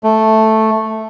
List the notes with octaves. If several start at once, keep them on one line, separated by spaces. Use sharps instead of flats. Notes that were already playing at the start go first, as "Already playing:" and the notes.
A3